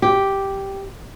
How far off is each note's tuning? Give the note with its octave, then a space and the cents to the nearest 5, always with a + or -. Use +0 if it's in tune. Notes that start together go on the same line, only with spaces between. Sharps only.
G4 -5